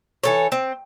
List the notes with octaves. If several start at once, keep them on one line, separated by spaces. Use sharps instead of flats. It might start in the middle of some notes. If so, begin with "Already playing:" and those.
E3 A4 C#5
C4